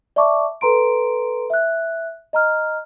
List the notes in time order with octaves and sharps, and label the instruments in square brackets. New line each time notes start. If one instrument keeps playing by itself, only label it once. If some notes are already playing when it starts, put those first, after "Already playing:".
[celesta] D5 E5 A5 C#6 D6
A4 B4 A#5 C6 D7
E5 F#6
D#5 A#5 F6